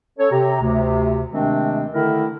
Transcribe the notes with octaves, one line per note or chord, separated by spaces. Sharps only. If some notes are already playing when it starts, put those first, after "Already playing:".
C#4 A4 C#5
C3 G4 A#5
D2 C3
C3 D#3 G#3 A3 C4 D4
D3 D#3 A3 E4 A#4